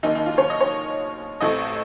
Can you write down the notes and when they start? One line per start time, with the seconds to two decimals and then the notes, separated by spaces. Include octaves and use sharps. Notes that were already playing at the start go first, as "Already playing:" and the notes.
0.03 D#2 D#3 A#3 D#4
0.15 D#4
0.26 F4
0.38 C#5
0.50 D#5
0.61 C#5
1.41 A1 A2 A3 C4 D#5